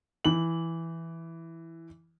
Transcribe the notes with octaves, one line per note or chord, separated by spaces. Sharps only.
E3 F#7